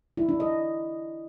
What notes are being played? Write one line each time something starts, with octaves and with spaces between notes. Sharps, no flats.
E4
D4
D#5